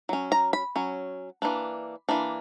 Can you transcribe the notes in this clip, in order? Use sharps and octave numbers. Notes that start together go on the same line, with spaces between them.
F#3 C#4
A#5
B5
F#3 C#4
E3 A#3 D4
E3 A#3 D4